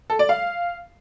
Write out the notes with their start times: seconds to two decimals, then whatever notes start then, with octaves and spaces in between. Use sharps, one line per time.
0.10 A4
0.19 D5
0.29 F5